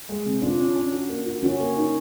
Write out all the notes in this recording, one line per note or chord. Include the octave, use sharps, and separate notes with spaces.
G#3
C3
D4 F4
C#4
C#4
F#4
A#3
F#4
C#4 F#4
A#3
D#4